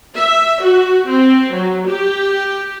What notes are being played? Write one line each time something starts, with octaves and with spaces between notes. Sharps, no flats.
E5
F#4
C4
F#3
G4